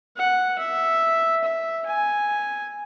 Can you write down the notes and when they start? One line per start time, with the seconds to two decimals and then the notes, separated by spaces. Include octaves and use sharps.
0.17 F#5
0.58 E5
1.44 E5
1.86 G#5